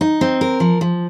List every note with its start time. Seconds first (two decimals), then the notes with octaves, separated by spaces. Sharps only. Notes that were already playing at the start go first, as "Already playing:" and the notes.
0.01 D#4
0.21 C4
0.41 A#4
0.60 F3
0.81 F3